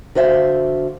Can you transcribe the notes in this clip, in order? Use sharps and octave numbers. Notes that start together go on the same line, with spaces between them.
D3 F#4 C5 E5 F5